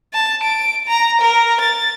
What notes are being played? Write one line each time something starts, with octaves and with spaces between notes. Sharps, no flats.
A5
D7
A#5
A#4
A6